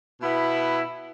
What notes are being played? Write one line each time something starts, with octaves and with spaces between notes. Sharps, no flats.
B2 B3 E4